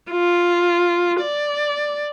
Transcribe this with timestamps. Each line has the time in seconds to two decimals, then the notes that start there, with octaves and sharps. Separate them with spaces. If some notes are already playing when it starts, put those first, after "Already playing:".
0.11 F4
1.21 D5